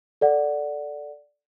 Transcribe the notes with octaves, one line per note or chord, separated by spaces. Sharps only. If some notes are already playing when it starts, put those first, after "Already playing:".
A4 D5 F#5